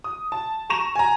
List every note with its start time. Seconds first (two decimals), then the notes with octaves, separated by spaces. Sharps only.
0.04 D#6
0.32 A5
0.70 A#5 C#6 A#6 E7 F7
0.95 G#5 A#5